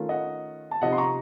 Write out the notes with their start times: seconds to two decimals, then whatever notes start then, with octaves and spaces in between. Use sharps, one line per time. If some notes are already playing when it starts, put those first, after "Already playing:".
Already playing: D#3 A3 C#4 F4
0.09 D#5 F#5
0.71 A5
0.82 C3 F3 C4 D#4 D#5 F#5
0.93 C6
0.98 A#5 C#6